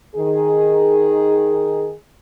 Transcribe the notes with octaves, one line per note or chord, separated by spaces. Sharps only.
D#3 G#4